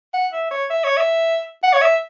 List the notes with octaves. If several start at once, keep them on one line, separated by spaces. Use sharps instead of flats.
F#5
E5
C#5
E5
C#5
E5
F#5
C#5
E5